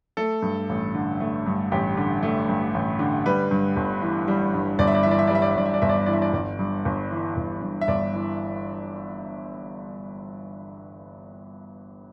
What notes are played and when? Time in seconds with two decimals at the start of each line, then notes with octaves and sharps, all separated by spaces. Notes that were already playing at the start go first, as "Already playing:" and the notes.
0.17 A3 A4
0.42 G2
0.69 A1
0.95 D3
1.20 A3
1.46 G2
1.72 A1 G4
1.97 D3
2.23 A3
2.49 G2
2.74 A1
2.99 D3
3.26 G3 B4
3.51 G2
3.76 G1
4.02 E3
4.28 G3
4.54 G2
4.79 G1 D5
4.87 E5
4.95 D5
5.03 E3 E5
5.11 D5
5.19 E5
5.27 D5
5.30 G3 E5
5.42 D5
5.51 E5
5.56 G2 D5
5.66 E5
5.74 D5
5.82 G1 E5
5.89 D5
5.97 E5
6.06 E3 D5
6.13 E5
6.22 D5
6.33 G1 D5
6.59 G2
6.85 G1
7.11 E3
7.37 G1
7.61 G2
7.81 E5
7.88 G1 D5
8.14 E3